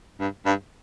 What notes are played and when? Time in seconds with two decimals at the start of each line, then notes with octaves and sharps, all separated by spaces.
0.20 G2
0.45 G2